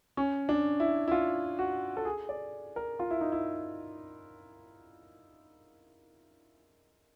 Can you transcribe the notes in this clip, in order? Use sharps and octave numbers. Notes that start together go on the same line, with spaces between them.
C#4
D4
E4
E4
F4
F#4
A4
G#4
D5
A#4
F4
E4
D#4
E4